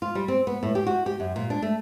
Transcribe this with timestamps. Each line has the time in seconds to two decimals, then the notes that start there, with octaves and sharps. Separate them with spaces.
0.02 F4
0.15 G3
0.28 C4
0.47 B3
0.63 A2
0.75 G4
0.87 F#4
1.06 G4
1.20 F#2
1.36 A#2
1.50 D4
1.62 A3